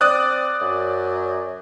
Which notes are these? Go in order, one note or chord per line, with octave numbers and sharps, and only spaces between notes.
C4 D5 D#6 F#6
F#2